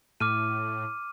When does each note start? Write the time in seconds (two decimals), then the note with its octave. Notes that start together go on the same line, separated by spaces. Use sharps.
0.20 A2 D6 F6 D#7